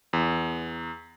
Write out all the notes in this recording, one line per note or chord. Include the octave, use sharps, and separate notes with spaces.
E2